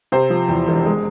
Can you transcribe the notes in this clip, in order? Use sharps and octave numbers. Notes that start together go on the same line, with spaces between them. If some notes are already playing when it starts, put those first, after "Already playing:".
C3 C5
F3
E2
E1
G#3